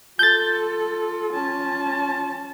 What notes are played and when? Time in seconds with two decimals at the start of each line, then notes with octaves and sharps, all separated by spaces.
0.19 F4 A4 G6 A6
1.33 C#4 A5